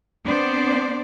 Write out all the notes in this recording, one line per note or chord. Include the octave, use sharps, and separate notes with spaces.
B3 C4 D4 C5 D5